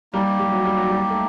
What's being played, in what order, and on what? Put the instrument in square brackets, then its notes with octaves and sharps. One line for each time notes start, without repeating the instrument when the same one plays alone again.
[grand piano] G3 [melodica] A#3 D#4 G4
[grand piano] G3
F#3
G3
F#3
G3
A3